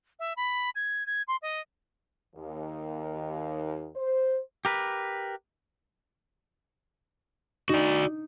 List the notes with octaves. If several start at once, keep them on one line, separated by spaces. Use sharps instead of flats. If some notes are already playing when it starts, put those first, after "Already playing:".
E5
B5
G#6
G#6
C6
D#5
D#2
C5
G4 A#4 B4
D#4 F#4 D5